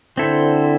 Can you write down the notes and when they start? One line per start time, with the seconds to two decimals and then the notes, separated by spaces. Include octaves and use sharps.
0.17 D3 C4 E4 A4 C5